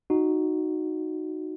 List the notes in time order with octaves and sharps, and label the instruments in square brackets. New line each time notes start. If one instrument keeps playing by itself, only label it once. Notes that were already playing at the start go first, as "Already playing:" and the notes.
[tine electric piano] D#4 F#4